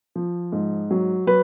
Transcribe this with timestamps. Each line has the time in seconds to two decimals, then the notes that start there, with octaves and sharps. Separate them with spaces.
0.16 F3
0.52 G#2
0.91 F#3
1.27 F#3 B4